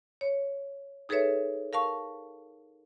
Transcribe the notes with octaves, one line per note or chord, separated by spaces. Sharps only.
C#5
D#4 G#4 A4 B4 C#5 E5
A#4 F5 A5 C#6